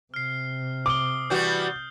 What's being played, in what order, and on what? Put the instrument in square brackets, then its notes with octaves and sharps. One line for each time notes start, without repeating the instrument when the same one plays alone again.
[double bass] C3 [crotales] F6 C7
[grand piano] D6 [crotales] D#6 G7
[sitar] E3 G3 F#4 [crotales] G6